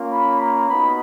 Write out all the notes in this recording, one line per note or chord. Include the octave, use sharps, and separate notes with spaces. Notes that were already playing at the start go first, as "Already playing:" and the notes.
Already playing: A#3 C#4 F4
B5
A#5
B3 D#4 F#4 B5